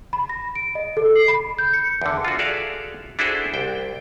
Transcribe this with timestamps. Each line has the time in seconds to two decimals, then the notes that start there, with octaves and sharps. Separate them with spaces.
0.13 B5
0.29 A#6
0.55 D7
0.75 D#5
0.97 A4
1.15 C7
1.28 B5
1.59 G6
1.73 C#7
2.02 E2 D3
2.25 F4 F#4
2.39 F#4 G#4 A4 D5 E5 F5
3.19 D4 E4 F#4 G#4 A4 C5
3.53 C2 G5